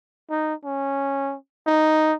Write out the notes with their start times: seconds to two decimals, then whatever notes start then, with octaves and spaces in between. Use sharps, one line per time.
0.30 D#4
0.65 C#4
1.67 D#4